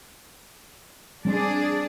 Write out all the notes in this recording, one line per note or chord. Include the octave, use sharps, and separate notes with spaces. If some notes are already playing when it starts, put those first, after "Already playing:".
G3 C4 D4 G#4 D5